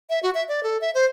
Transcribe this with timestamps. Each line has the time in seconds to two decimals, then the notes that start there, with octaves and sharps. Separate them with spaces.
0.10 E5
0.23 F#4
0.35 E5
0.48 D5
0.63 A4
0.81 E5
0.95 C5